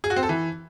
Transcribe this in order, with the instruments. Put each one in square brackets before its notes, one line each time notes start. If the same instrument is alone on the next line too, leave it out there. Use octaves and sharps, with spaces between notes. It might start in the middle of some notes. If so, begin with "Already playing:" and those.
[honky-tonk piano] G#4
F#4
C4
A4
E3